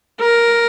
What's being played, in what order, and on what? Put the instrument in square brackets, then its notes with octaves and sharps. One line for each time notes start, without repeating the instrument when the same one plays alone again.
[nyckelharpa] A#4